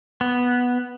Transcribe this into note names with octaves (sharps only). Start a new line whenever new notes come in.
B3